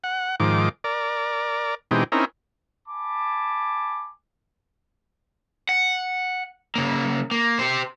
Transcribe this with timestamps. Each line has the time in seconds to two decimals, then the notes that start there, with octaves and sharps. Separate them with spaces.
0.04 F#5
0.40 G#2 D#3 F3 D6
0.84 A#4 D5
1.91 B2 E3 G#3 C4 D#4 G4
2.12 C4 C#4 D#4 E4 A#4
2.87 G#5 A5 B5 D6
5.69 F#5
6.76 C#3 A#3
7.31 A#3
7.59 G4 C5